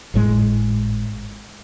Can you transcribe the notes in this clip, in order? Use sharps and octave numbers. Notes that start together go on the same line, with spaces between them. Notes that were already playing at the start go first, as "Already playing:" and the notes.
G#1 A2 G#3